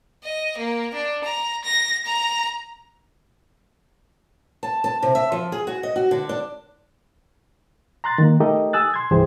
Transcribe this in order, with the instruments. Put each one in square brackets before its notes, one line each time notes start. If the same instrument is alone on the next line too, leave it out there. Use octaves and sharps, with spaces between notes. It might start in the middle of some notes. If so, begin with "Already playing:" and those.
[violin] D#5
A#3
D4
A#5
A#6
A#5
[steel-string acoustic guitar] A5
A5
C3
E5
F3
G#4
F#4
D#5
F#4
D3
D4
[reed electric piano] A#5 C6 F#6 A6
D#3 A#3
A3 D#4 G4 A4 A#4 D#5
G#5 D#6 E6 F#6 A6
C6 G#6
C2 G2 E3 G4 G#4 C5